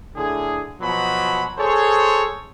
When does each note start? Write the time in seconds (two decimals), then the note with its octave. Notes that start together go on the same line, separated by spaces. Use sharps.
0.16 A2 D3 G#4
0.81 B2 F3 F#3 F#4 B5
1.58 G#4 A4 C5 C#5